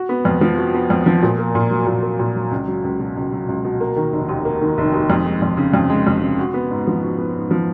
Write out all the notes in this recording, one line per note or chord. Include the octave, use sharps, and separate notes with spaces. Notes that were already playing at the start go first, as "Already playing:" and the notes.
Already playing: F#4
B3
F2
F3
F#4
B3
F2
F3
A#2
A#3
A#2
F#3
A#2
A#3
A#2
F#3
C#2
F#3
C#2
B2
C#2
F#3
C#2
B2
A#3
D#3
F1
D#2
A#3
D#3
F1
D#2
F2
G#3
F2
C#3
F2
G#3
F2
C#3
F#4
B3
G#2
F3
F#4
B3
G#2
F3